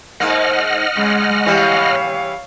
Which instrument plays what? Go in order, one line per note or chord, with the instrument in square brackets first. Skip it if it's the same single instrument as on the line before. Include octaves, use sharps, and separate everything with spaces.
[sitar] G#2 A#3 [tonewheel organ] D#5 F#5 F6
[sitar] C#3 [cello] G#3
[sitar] E3 G3 [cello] C#5 F5